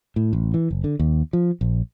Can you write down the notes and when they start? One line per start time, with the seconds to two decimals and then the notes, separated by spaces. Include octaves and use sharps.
0.16 A2
0.33 A1
0.54 E3
0.71 F#1
0.84 D3
0.99 D#2
1.33 F3
1.61 A#1